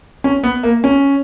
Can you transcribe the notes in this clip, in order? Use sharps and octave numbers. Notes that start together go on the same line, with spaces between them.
C#4
B3
A#3
C#4